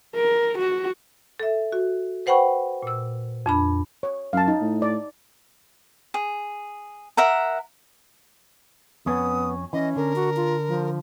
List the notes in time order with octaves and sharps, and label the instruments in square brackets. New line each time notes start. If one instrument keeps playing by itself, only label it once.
[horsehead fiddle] A#4
F#4
[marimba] A4 E5
F#4
B4 C5 F#5 G5 B5 C#6
A#2 E6
F2 D4 B5
[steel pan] C#5
[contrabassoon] F#2 [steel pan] F5 A5
[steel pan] D#4
[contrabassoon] A2
[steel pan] D5
[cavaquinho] G#4
A#4 E5 F#5 A#5
[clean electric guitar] F2 C#4 [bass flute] B3 [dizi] D#6
[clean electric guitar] E3 [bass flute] C#4 [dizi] D#5
[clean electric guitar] D3 [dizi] A#4
[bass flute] F#4
F4
F3